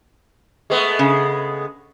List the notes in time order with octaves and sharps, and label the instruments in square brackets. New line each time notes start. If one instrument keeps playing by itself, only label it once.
[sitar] G#3 A3 B3
[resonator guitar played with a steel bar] C#3